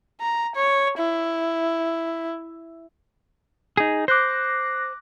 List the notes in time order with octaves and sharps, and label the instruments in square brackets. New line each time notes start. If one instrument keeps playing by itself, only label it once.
[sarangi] A#5
C#5
E4
[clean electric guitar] D#4 G#4
[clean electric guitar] C5 [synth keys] D6 F#6 A#6